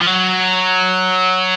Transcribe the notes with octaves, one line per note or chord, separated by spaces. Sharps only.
F3
F#3